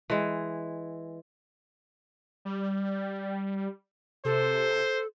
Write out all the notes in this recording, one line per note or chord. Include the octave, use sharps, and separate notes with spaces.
E3 G#3
G3
C3 A4 C5